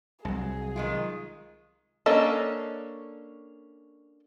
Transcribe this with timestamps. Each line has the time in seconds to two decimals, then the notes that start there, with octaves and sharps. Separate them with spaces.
0.25 C2 F#3 G#4 A5
0.76 D#3 G#3 F4
2.06 A#3 C#4 D4 A4 D#5